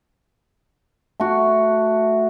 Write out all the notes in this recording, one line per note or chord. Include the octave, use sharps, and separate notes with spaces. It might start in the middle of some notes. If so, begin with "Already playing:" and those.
A3 F#4